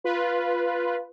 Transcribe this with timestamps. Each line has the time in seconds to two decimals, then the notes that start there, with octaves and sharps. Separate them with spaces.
0.04 F4 B4